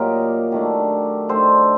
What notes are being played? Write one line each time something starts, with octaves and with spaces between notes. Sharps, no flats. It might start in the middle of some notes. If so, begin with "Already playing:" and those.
Already playing: A#2 F#3 A#3 G4 A#4 D#5
D#3 A3 D4
D#3 A3 D4 A4 C5